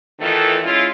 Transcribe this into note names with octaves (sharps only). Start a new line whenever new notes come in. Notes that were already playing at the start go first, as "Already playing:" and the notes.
E2 D#3 E3 A3 F4 A4
G#3 C#4 E4 F4